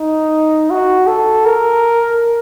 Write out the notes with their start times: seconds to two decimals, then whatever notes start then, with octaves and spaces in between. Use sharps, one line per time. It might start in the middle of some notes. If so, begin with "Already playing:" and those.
Already playing: D#4
0.70 F#4
1.07 A4
1.45 A#4